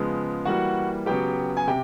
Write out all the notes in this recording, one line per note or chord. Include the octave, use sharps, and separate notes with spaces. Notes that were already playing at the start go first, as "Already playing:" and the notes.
Already playing: C#3 F3 G#3 B3
E3 G3 A#3 F#4 F#5
C#3 F#3 B3 G4 G5
G#5
C3 G4 G5